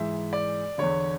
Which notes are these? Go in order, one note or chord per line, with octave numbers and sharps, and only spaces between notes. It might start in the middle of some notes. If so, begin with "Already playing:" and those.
Already playing: G#2 E3 E5
D5
E2 D3 C#5